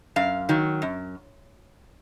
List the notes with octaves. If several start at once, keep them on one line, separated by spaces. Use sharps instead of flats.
F#2 F5
D#3 F#3
F#2